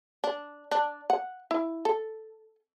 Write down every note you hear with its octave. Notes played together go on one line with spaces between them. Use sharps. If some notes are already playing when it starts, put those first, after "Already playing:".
D4
D4
F#5
E4
A4